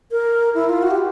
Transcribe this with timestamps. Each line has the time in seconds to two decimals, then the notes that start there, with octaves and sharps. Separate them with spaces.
0.11 A#4
0.55 E4
0.69 F4
0.82 F#4
0.91 G4